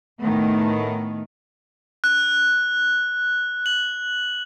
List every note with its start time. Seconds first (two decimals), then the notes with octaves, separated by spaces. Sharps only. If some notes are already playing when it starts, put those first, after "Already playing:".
0.21 A2 D#3 A3 B3
2.04 F#6
3.66 F#7